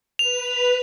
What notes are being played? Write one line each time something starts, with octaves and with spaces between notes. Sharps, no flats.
B4 F7